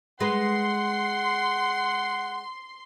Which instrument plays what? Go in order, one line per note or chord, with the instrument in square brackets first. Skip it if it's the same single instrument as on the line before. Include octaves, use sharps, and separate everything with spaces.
[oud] G#3 B4 [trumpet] F#5 [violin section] C6